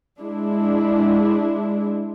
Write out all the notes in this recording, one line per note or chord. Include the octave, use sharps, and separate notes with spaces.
G#3 D4 E4